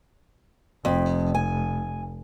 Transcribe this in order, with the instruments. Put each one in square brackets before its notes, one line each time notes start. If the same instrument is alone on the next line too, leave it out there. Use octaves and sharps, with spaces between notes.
[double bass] F1 [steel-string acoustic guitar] F2
[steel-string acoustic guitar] G#5